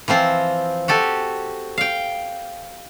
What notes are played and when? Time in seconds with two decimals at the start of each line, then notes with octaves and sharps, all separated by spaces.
0.08 E3 F3 C4 F4
0.88 F#4 G4 A4 G#5
1.78 F5 G5